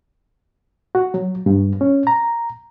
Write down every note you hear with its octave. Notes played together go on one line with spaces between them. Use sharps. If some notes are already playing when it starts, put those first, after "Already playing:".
F#4
F#3
G2
C#4
A#5